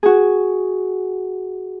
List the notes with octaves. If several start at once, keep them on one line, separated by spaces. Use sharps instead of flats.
F#4 G#4